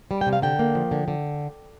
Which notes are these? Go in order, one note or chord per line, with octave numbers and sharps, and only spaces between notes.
G3
G5
C3
F5
D3 G5
A#3
F3
D3
D3